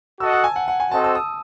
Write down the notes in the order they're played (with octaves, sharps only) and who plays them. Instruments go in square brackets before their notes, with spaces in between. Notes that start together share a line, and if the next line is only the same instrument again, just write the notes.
[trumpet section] F#4 A4 D#5 F#5 [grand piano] E6
[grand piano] A5
G#5
F#5
F#5
G#5
[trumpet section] C4 F#4 A4 C5 D#5 [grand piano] A5
[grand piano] E6
D#6